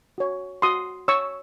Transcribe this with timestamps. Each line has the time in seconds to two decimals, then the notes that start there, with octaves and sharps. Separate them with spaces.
0.18 F#4 C#5
0.62 F#4 C6 D#6
1.08 C#5 C#6 E6